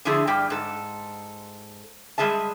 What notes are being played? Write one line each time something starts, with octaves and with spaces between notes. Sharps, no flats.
D3 F3 A3 E4 G#4 A4
G2 G3 G4 G5
G#2 A4
G3 G#3 G#4 E5 A5